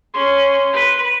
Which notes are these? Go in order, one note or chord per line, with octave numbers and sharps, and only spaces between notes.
C#4 C6
B4